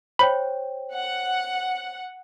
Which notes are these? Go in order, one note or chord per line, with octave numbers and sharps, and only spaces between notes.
C5 C#5 G5 B5
F#5